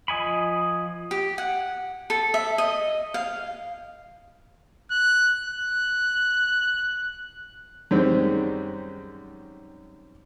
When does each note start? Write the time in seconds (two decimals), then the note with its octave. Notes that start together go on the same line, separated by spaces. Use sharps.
0.08 F3 D#5 G#5 B5
1.11 G4
1.38 F#5
2.10 A4
2.34 E5
2.58 D#5
3.14 F5
4.91 F#6
5.47 F#6
7.91 F#2 D#3 G3 G#3 C4